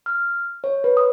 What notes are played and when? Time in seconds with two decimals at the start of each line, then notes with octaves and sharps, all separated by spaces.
0.06 F6
0.64 C#5
0.84 B4
0.97 D#6